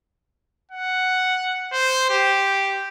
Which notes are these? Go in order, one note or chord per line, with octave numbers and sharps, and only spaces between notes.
F#5
C5
G4